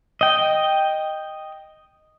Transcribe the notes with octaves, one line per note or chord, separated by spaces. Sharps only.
D#5 G5